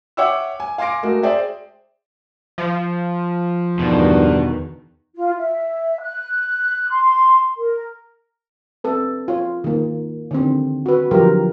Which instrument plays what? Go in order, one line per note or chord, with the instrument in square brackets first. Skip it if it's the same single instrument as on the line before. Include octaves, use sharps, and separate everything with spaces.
[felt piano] C#5 E5 F#5 G5 D6 E6
G#5
F5 G#5 C6 D6 A#6 D7
G#3 A3 F#4 A#4
G#4 C5 D5 E5 G5 G#5
[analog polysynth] F3
[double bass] E2 D#3 [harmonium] G2 D4 [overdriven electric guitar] B2
[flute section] F4
E5
F#6
C6
A#4
[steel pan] C4 A4 B4
F4 C#5
D#3 A#3
D3 D#3 C4
F#4 B4
D3 F3 F#3 F4 G4 A#4